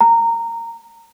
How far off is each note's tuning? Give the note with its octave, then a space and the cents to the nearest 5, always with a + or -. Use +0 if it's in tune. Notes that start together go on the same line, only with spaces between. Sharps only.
A#5 -15